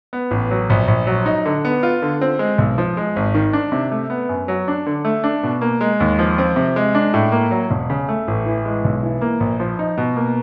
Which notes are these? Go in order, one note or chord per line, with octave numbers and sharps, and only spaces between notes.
B3
A1
F#3
A#1
A#1
F#3
D#4
D3
B3
F4
D3
C4
G#3
B1
F3
G#3
G#1
D#3
D4
C3
A3
B3
F#2
F#3
D4
D3
A3
D4
B2
A#3
G#3
D#2
F3
C4
C3
G#3
D4
A2
A#3
F#3
E1
C#3
A3
A1
E3
G#3
B1
E3
A#3
A#1
F3
D#4
B2
A#3